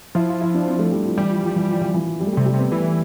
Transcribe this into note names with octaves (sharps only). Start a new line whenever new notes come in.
F3 E4
F4
E4
D4
C4
A3
G3
F3
E3 G3
F3
F3
E3
F3
E3
E3
F3
G3
A3
G3
C3
G3
C3 B3
E3 A3